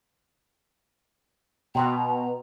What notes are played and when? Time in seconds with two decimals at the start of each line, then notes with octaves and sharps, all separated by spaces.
1.75 B2 G5 A#5 C6 D#6